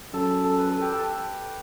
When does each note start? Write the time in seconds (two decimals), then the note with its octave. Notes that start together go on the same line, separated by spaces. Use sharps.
0.13 F#2 A4
0.44 A4
0.58 B4
0.69 A4
0.81 G4
0.92 A4